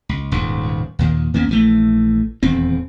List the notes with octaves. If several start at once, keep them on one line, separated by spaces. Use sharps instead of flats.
C#2
D#1 C#2 G#2
D#2 A#2 D#3
D#2 A#3 B3 C#4
A#1 E3 A3
D#1 E2 C4